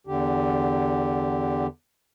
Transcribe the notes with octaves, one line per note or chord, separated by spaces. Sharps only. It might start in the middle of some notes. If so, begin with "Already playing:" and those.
E2 D3 G4